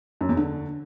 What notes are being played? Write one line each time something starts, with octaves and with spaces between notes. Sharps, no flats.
F#2
E2
D3